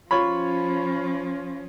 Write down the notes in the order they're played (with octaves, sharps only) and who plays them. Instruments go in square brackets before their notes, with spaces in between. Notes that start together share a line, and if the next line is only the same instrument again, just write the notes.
[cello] F3 C#4 [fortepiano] F4 C#5 B5